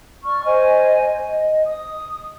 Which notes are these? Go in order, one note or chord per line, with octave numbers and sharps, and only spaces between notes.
D5 C#6 F6
C5 D#5 G#5
D#5
D#6